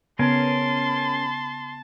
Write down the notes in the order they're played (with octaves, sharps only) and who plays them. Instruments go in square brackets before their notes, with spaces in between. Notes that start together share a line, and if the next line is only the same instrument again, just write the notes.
[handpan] C#3 B3 [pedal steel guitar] C#4 G#4 A#4 [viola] A5 [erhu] C6